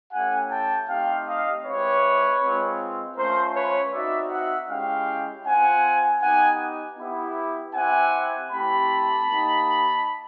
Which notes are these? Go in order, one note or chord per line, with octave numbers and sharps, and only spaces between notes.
A3 C#4 E4 G4 F#5 G#5
G5 A5
A3 C4 D#4 G4 F5 G5
D#5 F5
G#3 C4 E4 G4 B4 C#5
G#3 C4 F4
A3 C#4 F4 A#4 C5
B4 C#5
C4 D#4 F#4 D5 E5
E5 F#5
G#3 C#4 E4 G4 F5 G5
C4 F4 F#5 G#5
B3 D#4 G4 F#5 G#5
B3 E4 G4
C4 E4 G4 F#5 G#5
A3 C4 E4 G4 A5 B5
A#3 D#4 G4